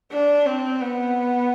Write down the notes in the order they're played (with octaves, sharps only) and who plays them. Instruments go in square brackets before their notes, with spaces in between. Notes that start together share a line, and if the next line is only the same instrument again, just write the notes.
[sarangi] D4
C4
B3